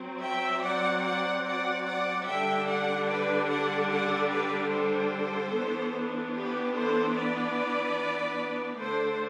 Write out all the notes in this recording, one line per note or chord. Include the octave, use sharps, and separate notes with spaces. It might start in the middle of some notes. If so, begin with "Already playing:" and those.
Already playing: F#3 C4
E5 G5
D5 F#5
D5 F#5
D5 F#5
D5 F#5
D3 G3 D4 E5 G5
D5 F#5
B4 D5
D5 F#5
D5 F#5
B4 D5
A4 C5
E3 B3 D4
G4 B4
A4 C5
B4 D5
D3 A3 D4 A4 C5